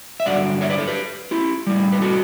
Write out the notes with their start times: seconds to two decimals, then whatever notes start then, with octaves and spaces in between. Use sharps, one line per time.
0.20 E5
0.26 G2 D3 F#3 D5 F#5
0.61 C#5 E5
0.70 B4 D5
0.78 A4 C#5
0.87 G4 B4
1.31 E4 G4
1.67 A2 G3
1.92 B4
2.02 F#4 A4